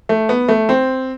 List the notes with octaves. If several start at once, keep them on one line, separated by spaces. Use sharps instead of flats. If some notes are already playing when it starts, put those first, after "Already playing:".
A3
B3
A3
C4